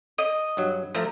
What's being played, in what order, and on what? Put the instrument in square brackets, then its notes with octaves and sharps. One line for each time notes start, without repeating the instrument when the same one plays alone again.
[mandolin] D#5
[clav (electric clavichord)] G2 F#3
[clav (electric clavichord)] F3 A3 [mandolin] A#5